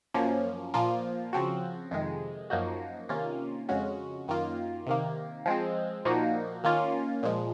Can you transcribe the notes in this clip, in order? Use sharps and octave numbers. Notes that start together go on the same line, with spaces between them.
F#2 F3 A#3 C#4
A#2 F3 A#3 F4
C#3 F3 C4 F#4
F2 C3 D#3 G#3
F#2 F3 A#3 D#4 F#4
C3 D#3 A#3 C#4 F4
F2 C#3 G#3 C#4 F#4
F#2 D#3 A#3 F4
C3 D#3 A#3
F3 G#3 C4
A#2 F3 A#3 D#4 F#4
D#3 A#3 C#4 F4
A#2 F3 G#3